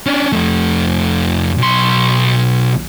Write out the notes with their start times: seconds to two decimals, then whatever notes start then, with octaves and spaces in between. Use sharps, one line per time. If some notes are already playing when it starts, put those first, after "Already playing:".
0.06 C#4 D4
0.33 F2 A3
1.58 B1 C6